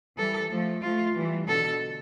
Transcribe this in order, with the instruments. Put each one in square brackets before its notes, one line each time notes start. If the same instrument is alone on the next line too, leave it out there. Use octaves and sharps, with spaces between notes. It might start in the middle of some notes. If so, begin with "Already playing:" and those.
[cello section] E3 G3 [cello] A4
[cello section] F3 A3
[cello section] F3 A3 [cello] F4
[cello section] E3 G3
[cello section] B2 D3 [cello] A4